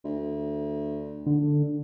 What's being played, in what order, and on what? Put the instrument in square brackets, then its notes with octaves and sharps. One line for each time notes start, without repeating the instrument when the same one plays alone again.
[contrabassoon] D2
[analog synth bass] D3